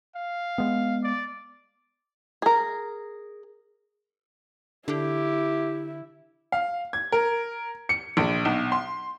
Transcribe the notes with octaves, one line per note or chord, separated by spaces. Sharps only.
F5
G#3 B3
D5
G#4 A#4
D3 E4 G4
F5
G#6
A#4
C#7
A#1
B1
C6